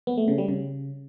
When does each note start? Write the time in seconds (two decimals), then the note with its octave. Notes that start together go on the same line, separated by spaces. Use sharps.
0.07 B3
0.18 A3
0.28 C#3
0.38 G3
0.48 C#3